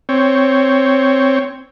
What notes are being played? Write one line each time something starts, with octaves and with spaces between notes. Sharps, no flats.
C4 C#5